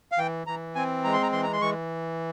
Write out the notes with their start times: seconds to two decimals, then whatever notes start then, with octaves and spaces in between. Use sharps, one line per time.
0.12 F5
0.18 E3 G5
0.47 E3 A#5
0.75 C4 G#5
1.04 G#3 A#5
1.13 C6
1.22 A#5
1.32 E3 C6
1.43 A#5
1.53 C6
1.61 E3 C#6